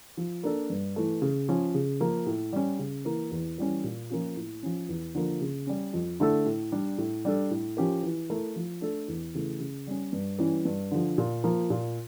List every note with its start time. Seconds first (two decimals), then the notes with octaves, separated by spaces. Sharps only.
0.17 F3
0.43 A#3 D4 A4
0.70 G2
0.96 E3 A3
1.22 C#3
1.49 F3 C#4
1.74 C#3
2.00 F3 A#3
2.26 A2
2.53 G3 C#4
2.79 C#3
3.05 E3 A#3
3.31 E2
3.58 E3 G3 C#4
3.84 A#2
4.10 F3 A#3 C#4 F4
4.37 A2
4.63 F3 C#4
4.89 E2
5.15 D3 F3 A#3
5.41 C#3
5.67 G3 C#4
5.93 F2
6.20 D3 A3 E4 A4
6.46 A2
6.72 G3 D4
6.98 A2
7.25 G3 D4 A4
7.51 A2
7.77 F3 C#4 G4 A#4
8.03 E3
8.30 A3 E4 A#4
8.56 F3
8.81 A3 D4 A4
9.08 E2
9.34 C#3 E3 A3
9.60 C#3
9.87 G3 C#4
10.13 G2
10.39 E3 G3 C#4
10.65 G2
10.91 D3 F3
11.18 A#2
11.44 F3 A#3
11.70 A#2